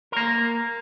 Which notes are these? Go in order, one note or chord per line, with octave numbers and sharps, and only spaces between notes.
A#3 A#4